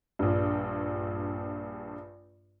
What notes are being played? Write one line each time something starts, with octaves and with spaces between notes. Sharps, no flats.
A#1 G2